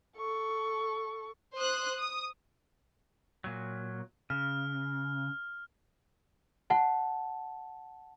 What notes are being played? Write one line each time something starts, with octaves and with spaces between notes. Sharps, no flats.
A4 C#6
C5 D#6 F#6
D#6
A#2 F#3
C#3 F6
F#5 A5